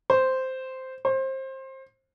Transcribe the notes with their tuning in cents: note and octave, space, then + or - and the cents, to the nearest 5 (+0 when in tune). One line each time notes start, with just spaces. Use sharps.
C5 -5
C5 +25